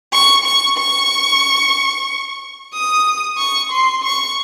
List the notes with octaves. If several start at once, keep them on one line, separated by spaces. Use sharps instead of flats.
C#6
C#6
C#6
D#6
C#6
C6
C#6